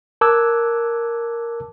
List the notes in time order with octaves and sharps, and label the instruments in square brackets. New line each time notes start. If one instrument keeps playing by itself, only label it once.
[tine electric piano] A#4 A5 D6 E6 F#6 G#6